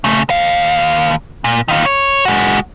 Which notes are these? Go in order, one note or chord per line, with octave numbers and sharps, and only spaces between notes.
C#3 A3
D#2 F5
A#2
D#3 F4
C#5
G#3 F#4